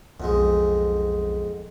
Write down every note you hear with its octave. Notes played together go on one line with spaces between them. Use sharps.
B1 F2 G#2 G#3